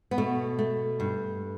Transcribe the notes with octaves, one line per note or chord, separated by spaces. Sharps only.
B3
B2 A3
A3
G2